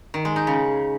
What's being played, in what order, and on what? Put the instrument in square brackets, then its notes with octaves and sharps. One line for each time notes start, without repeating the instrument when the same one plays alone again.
[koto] D#3
G#3
D#4
C#3